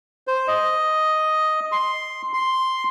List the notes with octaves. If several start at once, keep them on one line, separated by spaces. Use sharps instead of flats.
C5
D#5
C6
C6